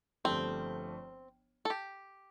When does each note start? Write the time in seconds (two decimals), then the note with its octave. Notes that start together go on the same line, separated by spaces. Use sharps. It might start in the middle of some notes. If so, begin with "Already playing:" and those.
0.24 G1 G2 F3 A3 C4
1.65 A4
1.70 G4